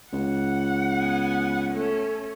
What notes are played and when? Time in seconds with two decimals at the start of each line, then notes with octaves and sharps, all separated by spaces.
0.13 C#2 F#5
0.97 B3 G#5
1.72 A3 C#4 A4